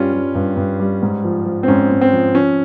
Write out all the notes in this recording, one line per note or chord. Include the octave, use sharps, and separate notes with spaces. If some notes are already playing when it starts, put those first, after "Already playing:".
Already playing: G2 G3 C#4 F4
G3
G2
G2
G3
G#2
F3
F3
C4
G#2 C#4
G#2
C4
F3
F3 C#4